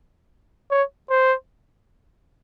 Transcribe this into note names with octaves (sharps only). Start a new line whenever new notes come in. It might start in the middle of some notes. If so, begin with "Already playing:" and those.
C#5
C5